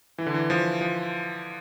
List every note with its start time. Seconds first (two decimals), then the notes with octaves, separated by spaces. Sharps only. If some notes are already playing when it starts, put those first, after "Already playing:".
0.18 E3
0.26 D3
0.34 E3
0.50 F3
0.81 F3